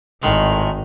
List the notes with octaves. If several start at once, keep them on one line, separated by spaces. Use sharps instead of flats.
G#1 A2 D#3 G#3